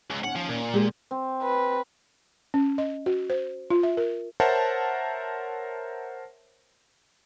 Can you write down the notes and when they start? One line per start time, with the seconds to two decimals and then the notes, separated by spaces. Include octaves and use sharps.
0.10 C#2
0.24 D#2 C#4 F#5
0.35 F3
0.49 A#2
0.74 G#3 G4 D5
1.11 C4
1.43 B4
2.54 C#4
2.78 D#5
3.06 F#4
3.30 C5
3.70 F4
3.83 E5
3.97 A#4
4.40 A#4 C5 C#5 E5 F#5 A5